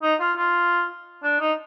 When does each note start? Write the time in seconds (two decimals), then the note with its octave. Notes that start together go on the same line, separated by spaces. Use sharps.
0.03 D#4
0.20 F4
0.37 F4
1.23 D4
1.40 D#4